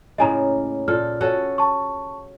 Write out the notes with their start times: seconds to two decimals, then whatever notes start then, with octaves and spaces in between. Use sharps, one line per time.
0.18 A2 C#3 A#3 D#5 G#5 A#5
0.88 A#2 A4 F6
1.21 C#4 F#4 A4
1.58 A5 C#6